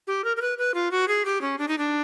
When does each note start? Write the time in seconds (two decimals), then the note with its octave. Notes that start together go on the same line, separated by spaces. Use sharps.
0.07 G4
0.24 A#4
0.37 A#4
0.41 B4
0.58 B4
0.74 F4
0.91 F#4
1.08 G#4
1.25 G4
1.41 C#4
1.58 D4
1.68 D#4
1.78 D4